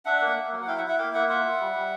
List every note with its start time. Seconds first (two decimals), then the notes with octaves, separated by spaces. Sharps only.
0.05 D4 E5 F#5
0.21 A#3
0.36 A#3
0.52 F#3
0.62 F#5
0.67 E4 F5 G5
0.78 E5 F#5
0.83 E4
0.88 E5 F#5
0.98 A#3 F5 G5
1.14 A#3 E5 F#5
1.29 F4 E5 F#5
1.45 F4
1.60 G3
1.75 G3